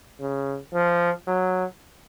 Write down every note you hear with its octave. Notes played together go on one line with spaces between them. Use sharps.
C#3
F3
F#3